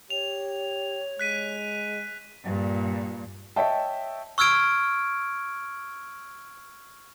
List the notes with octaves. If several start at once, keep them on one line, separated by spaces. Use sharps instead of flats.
G4 C#5 F7
G#3 F#6 B6 D#7
G2 A#2
C#5 D#5 E5 G5 A5
C#6 E6 F6 G#6 D7